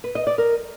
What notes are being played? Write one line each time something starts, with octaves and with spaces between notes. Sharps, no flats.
B4
D#5
D5
A#4